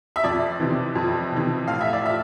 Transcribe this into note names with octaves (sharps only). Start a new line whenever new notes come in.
E5
F2 D5
C3 E3
F2
C3 E3
A2 F5
E5
D5
F3 E5